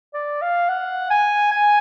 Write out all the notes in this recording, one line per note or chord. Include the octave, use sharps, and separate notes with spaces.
D5
F5
F#5
G#5
G#5